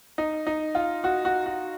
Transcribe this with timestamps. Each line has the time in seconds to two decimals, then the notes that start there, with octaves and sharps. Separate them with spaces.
0.18 D#4
0.47 D#4
0.75 F4
1.04 F#4
1.25 F#4
1.46 F#4